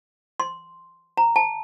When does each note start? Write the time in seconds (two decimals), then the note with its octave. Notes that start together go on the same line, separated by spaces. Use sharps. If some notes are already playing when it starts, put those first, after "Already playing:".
0.40 C6
1.17 A#5
1.36 A5